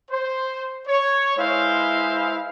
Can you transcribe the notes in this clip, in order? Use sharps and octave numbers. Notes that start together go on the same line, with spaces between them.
C5
C#5
G#3 E4 B4 C5 F5